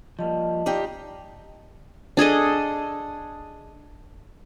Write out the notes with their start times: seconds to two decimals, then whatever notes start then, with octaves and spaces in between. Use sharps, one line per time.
0.19 F3 G3 A#3 D#5 A5
0.66 D#4 F4 G4 D5
2.17 D4 G#4 A4 D#5